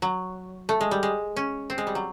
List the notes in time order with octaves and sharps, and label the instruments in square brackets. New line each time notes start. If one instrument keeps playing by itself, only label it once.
[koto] F#3
A3
G#3
G3
G#3
C#4
C4
G#3
G3
F#3